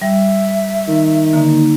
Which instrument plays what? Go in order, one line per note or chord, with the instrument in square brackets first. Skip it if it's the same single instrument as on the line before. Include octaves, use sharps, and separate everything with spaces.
[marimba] G3 [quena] E5
[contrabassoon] D#3
[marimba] D3 [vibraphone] A#3 D#4